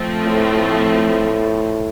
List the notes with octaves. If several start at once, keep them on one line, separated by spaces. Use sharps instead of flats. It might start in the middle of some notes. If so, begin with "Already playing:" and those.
Already playing: F3 A3 C4
A2